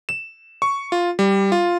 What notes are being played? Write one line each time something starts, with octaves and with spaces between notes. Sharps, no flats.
E7
C#6
F4
G3
F4